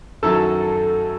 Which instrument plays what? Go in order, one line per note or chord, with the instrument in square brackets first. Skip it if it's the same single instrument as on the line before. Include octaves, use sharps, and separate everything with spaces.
[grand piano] F#2 D#3 F#3 C#4 E4 [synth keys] A4